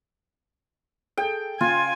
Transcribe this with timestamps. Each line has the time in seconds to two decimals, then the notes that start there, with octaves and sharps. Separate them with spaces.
1.17 G#4 A4 G5
1.61 C#3 F4 G#5